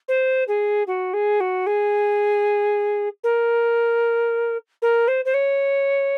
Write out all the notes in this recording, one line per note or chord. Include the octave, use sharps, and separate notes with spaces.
C5
G#4
F#4
G#4
F#4
G#4
A#4
A#4
C5
C5
C#5